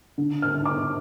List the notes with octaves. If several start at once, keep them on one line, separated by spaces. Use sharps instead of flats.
D3
F6
D3
D6